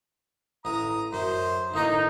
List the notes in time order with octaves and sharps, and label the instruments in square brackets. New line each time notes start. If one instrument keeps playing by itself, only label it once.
[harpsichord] A1 [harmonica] A#5 D#6
[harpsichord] F#2 [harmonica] C5
[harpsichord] A1 A#3 D6 [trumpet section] D#4